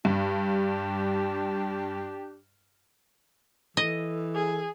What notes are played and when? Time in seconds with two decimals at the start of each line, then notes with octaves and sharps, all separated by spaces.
0.05 G2 D4 G4
3.77 E3 A4 D#5
4.35 G#4